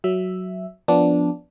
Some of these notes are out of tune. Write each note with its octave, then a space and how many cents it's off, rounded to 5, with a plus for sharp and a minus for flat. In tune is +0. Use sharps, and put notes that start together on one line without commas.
F#3 +0 E5 +0
F3 +0 B3 +0 D4 -10